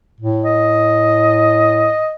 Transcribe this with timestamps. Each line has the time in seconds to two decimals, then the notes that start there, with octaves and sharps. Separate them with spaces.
0.20 A2
0.45 D#5